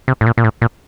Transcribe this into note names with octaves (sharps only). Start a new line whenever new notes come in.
C3
A2
A#2
A#2
A2
A#2